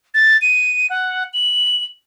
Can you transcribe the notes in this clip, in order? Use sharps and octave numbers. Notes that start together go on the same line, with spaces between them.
A6
D#7
F#5
F#7